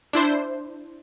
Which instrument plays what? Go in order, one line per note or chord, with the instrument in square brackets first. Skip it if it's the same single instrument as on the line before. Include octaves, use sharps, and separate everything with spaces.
[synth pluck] D4 E4 C5